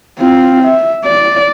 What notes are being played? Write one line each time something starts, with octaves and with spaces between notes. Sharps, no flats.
C4 F4
E5
D5